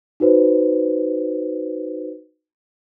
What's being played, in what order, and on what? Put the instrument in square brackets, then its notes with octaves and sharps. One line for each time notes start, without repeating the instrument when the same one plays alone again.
[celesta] D#4 F#4 B4 C5